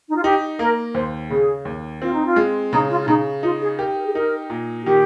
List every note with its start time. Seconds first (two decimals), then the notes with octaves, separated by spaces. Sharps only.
0.08 D#4
0.15 F4
0.24 D#4 G4
0.59 A#3 A#4
0.94 D#2 C5
1.30 C#3 G#4
1.65 D#2
2.02 C4 F4
2.14 D#4
2.26 F4
2.36 G#3
2.73 C#3 D#4
2.91 F4
3.02 F4
3.08 C#3 D#4
3.43 D#4 F4
3.61 G#4
3.79 G4 A#4
3.97 A#4
4.05 G#4
4.13 D#4 A#4
4.50 A#2
4.82 F4
4.85 D#3 G4